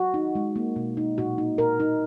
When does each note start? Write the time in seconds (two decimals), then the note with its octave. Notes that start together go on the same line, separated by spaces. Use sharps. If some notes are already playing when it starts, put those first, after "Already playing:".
Already playing: F#4
0.14 D#4
0.35 G#3
0.56 A#3
0.76 B2
0.97 D#4
1.18 A#2 F#4
1.38 D#4
1.58 A#2 A#4
1.80 D#4